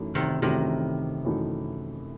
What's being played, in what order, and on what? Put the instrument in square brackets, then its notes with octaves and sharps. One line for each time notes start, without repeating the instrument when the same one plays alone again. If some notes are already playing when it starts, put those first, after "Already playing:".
Already playing: [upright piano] F#2 E3 A3 D#4
[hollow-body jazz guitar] C3 D#3
[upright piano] F#2 E3 A3 D#4 [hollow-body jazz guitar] C3 D#3
[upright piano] F#2 E3 A3 D#4